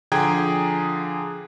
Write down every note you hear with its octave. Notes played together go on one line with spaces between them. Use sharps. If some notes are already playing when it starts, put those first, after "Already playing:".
D3 F3 G#4 G5 A#5 G#6